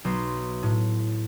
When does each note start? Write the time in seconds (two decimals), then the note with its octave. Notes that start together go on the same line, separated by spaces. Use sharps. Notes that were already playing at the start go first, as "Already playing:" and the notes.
0.05 B1 C6
0.63 A2